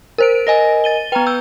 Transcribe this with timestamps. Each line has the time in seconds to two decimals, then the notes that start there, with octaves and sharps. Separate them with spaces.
0.18 A#4 C5 D7
0.47 A#4 D#5 G#5 A#6
0.84 A6 D#7 G7
1.12 B3 B4 G5 A#5
1.27 E6 G6